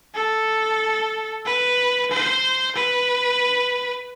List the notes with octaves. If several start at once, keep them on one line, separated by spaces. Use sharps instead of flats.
A4
B4
C5
B4